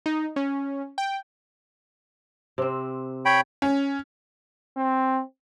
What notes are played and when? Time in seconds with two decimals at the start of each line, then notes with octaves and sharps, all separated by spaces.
0.06 D#4
0.36 C#4
0.98 G5
2.58 C3 C4
3.25 C#5 G5 B5
3.62 C#4
4.76 C4